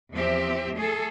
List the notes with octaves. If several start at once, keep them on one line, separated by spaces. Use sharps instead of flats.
E2 F3 C4 G4 E5
A3 G#4 A4